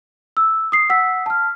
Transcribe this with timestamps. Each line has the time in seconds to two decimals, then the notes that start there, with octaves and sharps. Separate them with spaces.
0.37 E6
0.72 D#6 C7
0.90 F#5 E6 B6
1.26 A5 F6